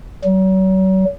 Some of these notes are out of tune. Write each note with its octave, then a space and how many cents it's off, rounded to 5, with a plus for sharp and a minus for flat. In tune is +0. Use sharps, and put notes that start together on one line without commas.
F#3 +40